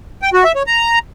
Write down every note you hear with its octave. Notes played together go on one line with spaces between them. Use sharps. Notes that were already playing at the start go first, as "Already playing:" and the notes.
G5
F#4
E5
C#5
A#5